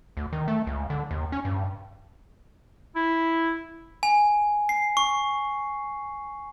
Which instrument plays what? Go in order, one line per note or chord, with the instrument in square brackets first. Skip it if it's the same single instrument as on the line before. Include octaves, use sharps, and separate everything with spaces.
[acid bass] D2
D#3
A3
C#2
D3
D#2
C#4
G2
[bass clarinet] E4
[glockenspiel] G#5
C7
C#6